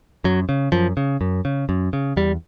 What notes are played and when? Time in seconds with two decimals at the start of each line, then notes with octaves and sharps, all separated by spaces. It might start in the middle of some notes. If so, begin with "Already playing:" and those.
0.24 F#2 F#3
0.49 C#3
0.72 F#2 F3
0.97 C#3
1.21 F#2
1.45 C#3
1.69 F#2
1.93 C#3
2.17 E2 G3